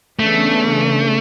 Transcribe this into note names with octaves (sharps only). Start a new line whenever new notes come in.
C#3 E3 A3 B3 D4